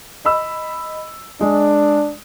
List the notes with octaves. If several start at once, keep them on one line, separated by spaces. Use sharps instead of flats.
D#5 B5 E6
G#3 D4